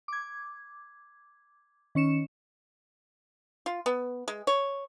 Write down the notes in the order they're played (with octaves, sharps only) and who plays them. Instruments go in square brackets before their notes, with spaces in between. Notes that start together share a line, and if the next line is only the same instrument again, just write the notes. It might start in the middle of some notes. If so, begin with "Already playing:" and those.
[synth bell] D6 G#6
D#3 C#4 C#7 E7
[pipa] F4
B3
G#3
C#5